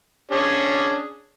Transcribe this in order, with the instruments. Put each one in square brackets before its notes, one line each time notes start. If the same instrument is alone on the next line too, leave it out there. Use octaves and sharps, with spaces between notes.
[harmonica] C#4 D4 G#4